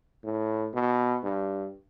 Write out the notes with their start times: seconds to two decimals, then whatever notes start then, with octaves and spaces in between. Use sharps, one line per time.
0.24 A2
0.74 B2
1.23 G2